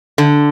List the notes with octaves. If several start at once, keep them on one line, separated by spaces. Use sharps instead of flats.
D3